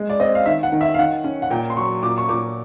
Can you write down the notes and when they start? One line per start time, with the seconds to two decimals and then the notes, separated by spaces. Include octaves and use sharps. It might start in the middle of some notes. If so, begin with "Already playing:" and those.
Already playing: G#3
0.09 D5
0.20 C4 D#5
0.35 F5
0.46 D#3 E5
0.63 F#5
0.72 D#3
0.81 E5
0.94 F5
0.98 D#3 F#5
1.24 C#4
1.42 F#5
1.50 A#2 G5
1.70 C6
1.77 F#3 C#6
2.03 A#2 D6
2.18 C#6
2.29 A#2 D6